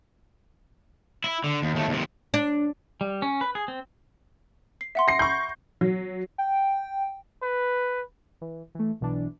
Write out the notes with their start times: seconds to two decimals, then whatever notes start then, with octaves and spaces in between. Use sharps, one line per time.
1.24 E4
1.44 D3
1.62 D#2
1.75 D#2 A3
1.89 D#2 C3
2.34 D4
3.01 G3
3.22 C#4
3.41 B4
3.55 G#4
3.68 C4
4.81 C7
4.95 E5 F#5 C6
5.08 A#6 C7 C#7
5.19 B5 C#6 G6
5.81 F#3
6.38 G5
7.43 B4
8.41 E3
8.75 E3 A3
9.00 B1 B2 E3 D4